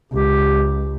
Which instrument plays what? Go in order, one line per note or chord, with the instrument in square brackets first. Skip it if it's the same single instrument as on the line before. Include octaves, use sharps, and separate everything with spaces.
[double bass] C#2 [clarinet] G4